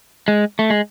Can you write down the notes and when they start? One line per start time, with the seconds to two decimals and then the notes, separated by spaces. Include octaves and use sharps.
0.28 G#3
0.59 A3
0.70 G#3